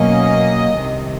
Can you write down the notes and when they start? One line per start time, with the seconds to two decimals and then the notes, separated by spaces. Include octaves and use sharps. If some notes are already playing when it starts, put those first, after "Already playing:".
Already playing: B2 F#3 A#3 C#4 D#5
0.77 C2 C3 D#3